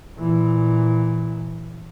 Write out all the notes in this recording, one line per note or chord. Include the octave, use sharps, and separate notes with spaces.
A#2 E3